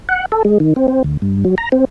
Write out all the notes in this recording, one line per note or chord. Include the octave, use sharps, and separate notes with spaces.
F#5
A4
G#3
D#3
C4
C4
D2
G2
F#3
A#5
C4